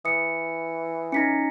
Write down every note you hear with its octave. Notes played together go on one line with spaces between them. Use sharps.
E3 D#6 C#7
C#4 D#4 A#6 B6 C#7